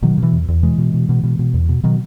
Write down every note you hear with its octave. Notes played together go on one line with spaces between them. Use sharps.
B2 D#3 F#3
B2 E3
E2
E2
B2 E3 G#3
B2
B2
B2
B2
B2
E2
B2
B2 D#3 F#3